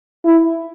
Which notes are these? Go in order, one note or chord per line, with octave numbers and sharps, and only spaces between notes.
E4